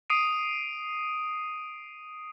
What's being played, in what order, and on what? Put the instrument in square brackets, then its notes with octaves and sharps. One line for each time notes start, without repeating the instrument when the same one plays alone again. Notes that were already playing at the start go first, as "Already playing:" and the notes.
[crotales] D#6 C7 D7 D#7